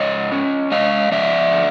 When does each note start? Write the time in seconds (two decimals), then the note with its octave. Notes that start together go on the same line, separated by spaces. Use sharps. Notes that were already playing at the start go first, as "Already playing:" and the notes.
Already playing: G#2 C#5 D#5
0.32 C#4
0.72 G#3 D#5 F5
1.12 F3 D5 E5
1.52 D3